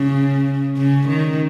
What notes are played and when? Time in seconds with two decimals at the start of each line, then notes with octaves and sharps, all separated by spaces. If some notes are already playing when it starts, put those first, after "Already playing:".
Already playing: C#3
0.77 C#3
1.08 D#3